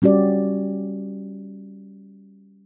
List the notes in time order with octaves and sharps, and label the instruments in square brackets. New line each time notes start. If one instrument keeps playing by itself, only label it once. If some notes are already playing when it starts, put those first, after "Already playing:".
[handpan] G3 C#4 F#4 G4 D5